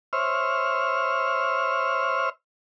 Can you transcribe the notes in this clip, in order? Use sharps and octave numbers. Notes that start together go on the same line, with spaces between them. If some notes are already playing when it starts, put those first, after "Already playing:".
C5 C#5 E5 F6